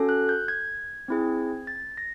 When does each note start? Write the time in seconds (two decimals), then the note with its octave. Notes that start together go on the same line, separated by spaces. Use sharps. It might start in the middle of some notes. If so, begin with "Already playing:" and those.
Already playing: C#4 F#4 A4
0.09 F#6
0.29 G6
0.48 G#6
1.08 C4 E4 G#4
1.67 A6
1.98 A#6